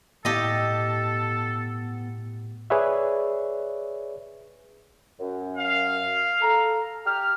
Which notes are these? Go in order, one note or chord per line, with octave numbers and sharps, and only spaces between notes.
A2 B3 G4 A4 D#5
G#4 B4 C#5 D5 E5
F#2
F5
A4 A#5
G4 F6